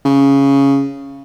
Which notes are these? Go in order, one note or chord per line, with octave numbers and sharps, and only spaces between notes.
C#3